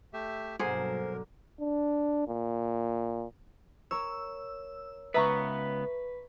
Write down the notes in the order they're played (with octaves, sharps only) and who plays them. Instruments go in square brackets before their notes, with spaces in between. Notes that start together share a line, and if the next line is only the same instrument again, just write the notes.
[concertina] A3 G4 E5
[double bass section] G2 B2 F#3 [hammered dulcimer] D3 A#3 [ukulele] G#4 C5 [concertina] A#4
[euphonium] D4
A#2
[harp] A#4 C#5 [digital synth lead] E6
[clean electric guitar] C#2 B3 [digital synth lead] B4 [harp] E5 A#5 C#6